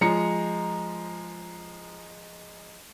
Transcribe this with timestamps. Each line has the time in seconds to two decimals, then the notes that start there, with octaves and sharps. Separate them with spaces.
0.01 F3 G#3 A#5 C#7